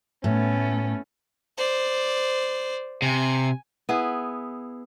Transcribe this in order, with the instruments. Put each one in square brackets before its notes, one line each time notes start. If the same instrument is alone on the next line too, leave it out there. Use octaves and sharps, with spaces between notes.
[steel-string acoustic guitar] A2 [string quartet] A3 B3 C#4
[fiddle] C5 D5
[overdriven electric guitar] C3 [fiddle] G#5
[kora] B3 E4 G#4